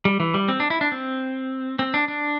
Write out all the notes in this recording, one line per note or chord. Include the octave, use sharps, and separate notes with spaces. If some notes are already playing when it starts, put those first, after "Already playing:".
G3
E3
G3
C4
D4
E4
D4
C4
C4
D4
D4